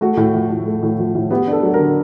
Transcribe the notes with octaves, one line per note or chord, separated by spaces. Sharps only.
A3 F#4
A2
F3
A2
A3
A2
F3
A2
B3 G4
D4
A4
F#3
A#4
D3